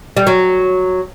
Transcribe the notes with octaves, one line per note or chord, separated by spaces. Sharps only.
G3
F#3